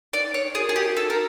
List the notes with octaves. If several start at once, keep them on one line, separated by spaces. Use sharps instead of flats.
D#4 D5
C#5
F#4 G#4 A#4
G#4
G4
D#4 A4
A#4